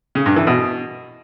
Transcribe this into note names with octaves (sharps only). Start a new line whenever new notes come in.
C#3
G2
E3
B2